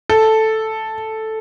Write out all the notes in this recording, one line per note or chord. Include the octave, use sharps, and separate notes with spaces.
A4